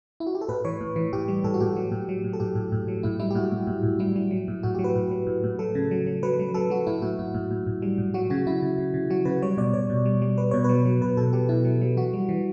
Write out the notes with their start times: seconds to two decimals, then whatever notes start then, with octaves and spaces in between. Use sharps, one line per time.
0.20 E4
0.27 F#4
0.35 G4
0.41 A4
0.49 A2 B4
0.65 E3 C#5
0.81 A2
0.96 E3
1.13 A2 G4
1.28 G3
1.44 A2 A4
1.54 F#4
1.60 A2 G4
1.77 F#3
1.92 A2
2.09 F#3
2.24 A2
2.33 A4
2.40 A2 G4
2.55 A2
2.72 A2
2.88 F#3
3.03 A2 E4
3.20 G3 E4
3.31 G4
3.35 A2 F#4
3.51 A2
3.67 A2
3.83 A2
3.99 G3 E4
4.16 G3
4.31 F#3
4.48 A2
4.63 A2 F#4
4.75 F#3 G4
4.84 B4
4.95 A2
5.11 F#3
5.27 A2
5.44 A2
5.59 F#3 A4
5.75 C#3
5.91 F#3
6.06 F#3
6.23 F#3 B4
6.39 F#3
6.54 F#3 A4
6.70 F#3 F#4
6.87 A2 E4
7.02 A2 F#4
7.19 A2 E4
7.34 A2
7.51 A2
7.67 A2
7.82 G3
7.98 A2
8.14 F#3 F#4
8.30 C#3 F#4
8.46 C#3 E4
8.62 C#3
8.78 C#3
8.94 C#3
9.10 F#3 F#4
9.25 C#3 B4
9.42 G3 C#5
9.57 B2 D5
9.73 B2 C#5
9.90 B2
10.05 G3
10.22 G3
10.37 G3 B4
10.51 B2 C#5
10.64 F#3 B4
10.85 F#3
11.01 B2 B4
11.17 B2 A4
11.33 F#3 G4
11.49 B2 E4
11.65 F#3
11.81 F#3
11.97 E3 F#4
12.13 G3
12.29 E3